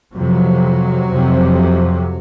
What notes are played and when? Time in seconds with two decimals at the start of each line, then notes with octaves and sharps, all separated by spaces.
0.16 F2 C3 F#3
1.10 F2 C3